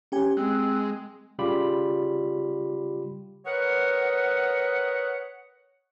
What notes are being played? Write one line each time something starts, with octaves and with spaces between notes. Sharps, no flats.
C#4 G4 G#5
G#3 C4 F#6
C#3 G3 F4 G4 B5
A#4 B4 C#5 D#5 F#5